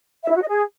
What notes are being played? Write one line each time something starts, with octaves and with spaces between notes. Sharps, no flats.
E5
E4
F#4
D#5
G#4